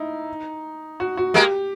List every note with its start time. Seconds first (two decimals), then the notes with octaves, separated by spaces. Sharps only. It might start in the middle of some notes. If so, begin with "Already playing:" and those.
Already playing: D#4 E4
1.00 F#4
1.17 F#4
1.34 G#3 A#3 G4